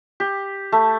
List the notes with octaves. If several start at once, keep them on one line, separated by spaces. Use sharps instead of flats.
G4
A3